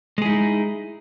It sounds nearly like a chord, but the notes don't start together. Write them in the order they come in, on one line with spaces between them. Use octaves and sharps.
G#3 G#4 E4 D#4